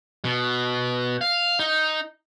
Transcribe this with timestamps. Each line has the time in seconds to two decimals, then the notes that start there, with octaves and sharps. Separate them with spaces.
0.25 B2
1.21 F5
1.59 D#4